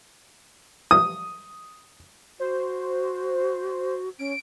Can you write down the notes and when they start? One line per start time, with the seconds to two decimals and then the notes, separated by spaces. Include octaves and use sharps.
0.91 D#6
2.40 F#4 C5
4.19 C#4 D7